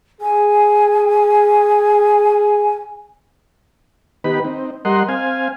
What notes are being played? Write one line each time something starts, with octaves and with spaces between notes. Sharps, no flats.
G#4 G#5
D#3 B3 D#4 G4 B4 B5
C4 D#4
G3 A#4 D#5 F#5 C6
C4 F5 G#5